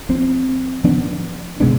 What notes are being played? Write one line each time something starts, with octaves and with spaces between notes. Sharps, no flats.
F3 C4
F3 B3 D4
B2 G#3 B3 D4